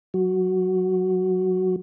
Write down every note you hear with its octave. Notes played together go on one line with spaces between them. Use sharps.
F#3 F#4